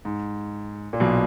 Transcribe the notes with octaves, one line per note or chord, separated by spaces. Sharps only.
G#2
A#2
B1 B2